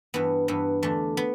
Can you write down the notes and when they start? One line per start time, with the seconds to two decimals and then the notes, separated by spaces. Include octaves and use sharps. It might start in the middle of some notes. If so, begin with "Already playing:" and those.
0.14 G2 E3 B3
0.48 G2 E3 B3
0.83 E2 D3 A3
1.17 B3